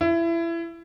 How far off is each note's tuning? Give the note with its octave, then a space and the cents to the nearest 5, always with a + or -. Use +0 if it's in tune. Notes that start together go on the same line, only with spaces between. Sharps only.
E4 +25